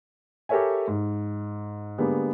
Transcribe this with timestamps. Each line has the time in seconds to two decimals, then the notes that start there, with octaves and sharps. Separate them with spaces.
0.49 G4 A4 A#4 C#5 E5 G#5
0.88 G#2
1.98 D3 G3 G#3 A#3 B3